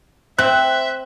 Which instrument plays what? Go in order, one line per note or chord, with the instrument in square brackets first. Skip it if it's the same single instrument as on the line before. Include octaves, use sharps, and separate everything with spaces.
[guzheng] C4 [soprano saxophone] E5 [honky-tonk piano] F#6